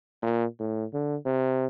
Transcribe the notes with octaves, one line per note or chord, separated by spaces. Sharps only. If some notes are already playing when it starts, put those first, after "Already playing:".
A#2
A2
D3
C3